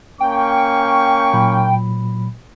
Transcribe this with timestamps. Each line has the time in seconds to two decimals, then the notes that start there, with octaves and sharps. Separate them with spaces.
0.20 A#3 C#4 G5 C#6
1.34 A#2 F#3 B5